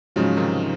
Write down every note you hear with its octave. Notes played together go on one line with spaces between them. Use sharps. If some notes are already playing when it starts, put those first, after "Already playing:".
G#2 C#3 F3 F#3 C#4 G#4
C3 D#3